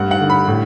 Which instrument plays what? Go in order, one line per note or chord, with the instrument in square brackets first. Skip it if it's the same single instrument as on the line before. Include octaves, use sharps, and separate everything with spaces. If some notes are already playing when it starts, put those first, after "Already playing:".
Already playing: [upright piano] G2 A3 F#5
F#5
D3
B5
A2